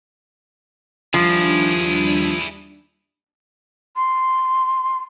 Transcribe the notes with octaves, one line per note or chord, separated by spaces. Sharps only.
D#2 F3 G3 D4 E4 G#4
C6